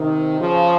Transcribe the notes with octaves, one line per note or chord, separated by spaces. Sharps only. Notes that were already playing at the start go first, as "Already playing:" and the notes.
Already playing: C3 D#3
C#3 F3